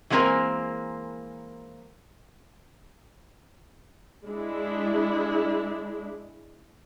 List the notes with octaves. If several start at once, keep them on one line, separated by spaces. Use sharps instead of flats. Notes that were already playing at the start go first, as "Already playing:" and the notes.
E3 G#3 A#3 C4 A#4 G#5
G#3 D4 E4